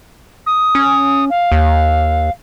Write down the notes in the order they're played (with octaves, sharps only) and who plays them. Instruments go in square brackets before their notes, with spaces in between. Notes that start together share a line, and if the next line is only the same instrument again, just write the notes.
[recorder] D#6
[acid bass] C#4
[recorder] F5
[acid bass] D#2